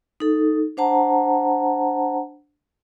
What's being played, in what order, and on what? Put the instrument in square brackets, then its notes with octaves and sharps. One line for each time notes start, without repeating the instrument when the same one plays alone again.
[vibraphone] D#4 A4
D4 C5 F#5 A5 A#5